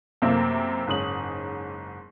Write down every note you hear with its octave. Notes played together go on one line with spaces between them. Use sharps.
F#2 C3 A3 A#3 C4 E4
F#1 G#2 C#4 D#6 F#7